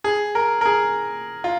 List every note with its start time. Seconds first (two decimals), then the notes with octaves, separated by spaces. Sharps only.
0.04 G#4
0.35 A#4
0.61 A#4
0.66 G#4
1.44 F4